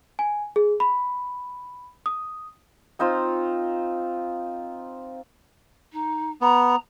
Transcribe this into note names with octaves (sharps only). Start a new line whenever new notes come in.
G#5
G#4
B5
D#6
C4 D#4 F4 C5
D#4
B3 A#5